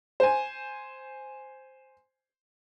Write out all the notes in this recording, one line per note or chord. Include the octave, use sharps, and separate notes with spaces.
C5 G#5